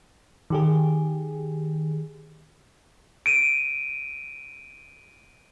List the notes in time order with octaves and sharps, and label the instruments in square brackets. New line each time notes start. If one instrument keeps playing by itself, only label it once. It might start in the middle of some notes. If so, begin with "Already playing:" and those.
[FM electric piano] D#3 G4 G#4
[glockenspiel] D7 D#7